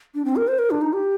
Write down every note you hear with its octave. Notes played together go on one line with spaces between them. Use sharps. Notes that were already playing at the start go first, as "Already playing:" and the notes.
D4
C4
A#4
C5
A#4
D4
D#4
G4